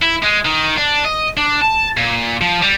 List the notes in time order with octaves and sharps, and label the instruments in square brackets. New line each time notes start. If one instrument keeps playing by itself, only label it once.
[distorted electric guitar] E4
G#3
D#3
D4
D#5
D4
A5
A#2
F3
G3